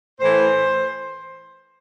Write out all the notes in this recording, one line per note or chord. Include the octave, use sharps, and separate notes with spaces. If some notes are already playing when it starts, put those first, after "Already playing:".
A2 E3 C5